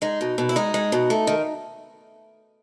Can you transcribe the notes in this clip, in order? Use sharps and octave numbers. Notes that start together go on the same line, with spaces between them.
G#3 D#4
B2
B2
E4
G#3 D#4
G#3
B2
A3
D#3